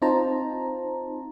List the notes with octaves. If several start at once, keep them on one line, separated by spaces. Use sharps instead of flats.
C4 D#4 F4 C5 A5 A#5